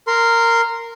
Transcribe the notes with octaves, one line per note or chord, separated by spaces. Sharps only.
A#4 C6